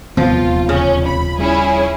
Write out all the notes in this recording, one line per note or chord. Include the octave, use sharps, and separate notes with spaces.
D#1 E2 C3 D#3 F3 B3 F4
C#3 C#4
B5
G3 C#4 E4 G#4